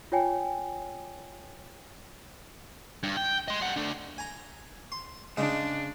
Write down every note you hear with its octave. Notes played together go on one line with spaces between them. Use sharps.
F4 C#5 G5 G#5
G2
G5
D#5 C6
G3 F#5
A3 D4
G#5 A#5
C6
C#3 G#3 D4 D#4